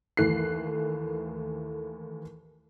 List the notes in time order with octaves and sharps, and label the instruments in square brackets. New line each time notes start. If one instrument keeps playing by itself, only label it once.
[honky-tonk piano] D#2 E3 A3 F#6 C7